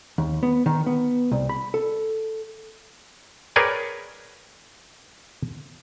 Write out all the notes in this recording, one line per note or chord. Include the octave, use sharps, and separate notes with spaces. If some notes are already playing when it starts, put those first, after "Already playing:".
D#2
B3
D#3
B3
C2
B5
A4
G#4 A#4 B4 C#5 D5 G5